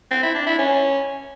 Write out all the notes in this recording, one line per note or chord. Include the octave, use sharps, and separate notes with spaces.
C4
E4
D4
E4
C#4